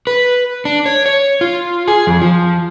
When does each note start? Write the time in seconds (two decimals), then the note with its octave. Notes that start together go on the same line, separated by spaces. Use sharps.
0.07 B4
0.65 D4
0.86 C#5
1.06 C#5
1.41 F4
1.88 G#4
2.07 F2
2.22 F3